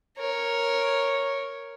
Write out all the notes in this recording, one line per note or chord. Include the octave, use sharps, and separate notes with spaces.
A#4 C#5